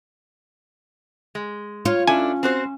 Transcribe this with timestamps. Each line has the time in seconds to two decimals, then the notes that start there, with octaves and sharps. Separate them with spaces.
1.35 G#3
1.85 F4 C#5
2.08 C#4 D4 E4 A4 G#5
2.43 C4 F#4 C5